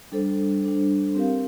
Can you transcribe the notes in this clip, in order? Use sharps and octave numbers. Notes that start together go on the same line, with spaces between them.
G3 D4 A4 C5
G3 D4 A4 C5
C4 G4 A#4 F5